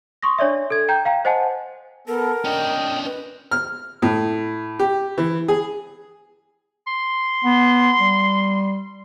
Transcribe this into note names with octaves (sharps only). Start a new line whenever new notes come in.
C6 C#6 D#6 A#6
D4 C#5 D5 E5
A4 G#6
G5 A#5 G6
F5 G5 A#5
C5 D#5 F#5 G#5 A5
B3 A4 A#4
C#4 D4 D#5 G5
B4
F6
A2
G4
E3
G#4
C6
B3
G3